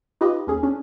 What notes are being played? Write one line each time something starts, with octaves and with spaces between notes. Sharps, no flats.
D#4 F4 G4 B4 D#5
D#2 C#4 G#4
C#4 D4